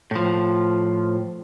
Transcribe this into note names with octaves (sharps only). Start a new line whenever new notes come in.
A2 F3